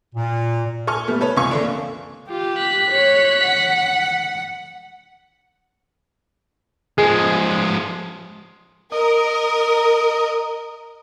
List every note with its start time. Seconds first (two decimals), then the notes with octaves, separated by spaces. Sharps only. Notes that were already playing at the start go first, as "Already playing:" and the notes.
0.15 A#2
0.87 A4 G#5 C#6 F6
1.08 G3 A3 B3
1.21 A4 B4 C#5
1.36 C#2 C3 F4 G#5 C#6
1.51 D3 A#3 D4
2.30 F4 G4
2.59 F#6 B6
2.91 C#5
3.45 F#5
6.98 F3 G#3 G#4
8.92 A#4 D#5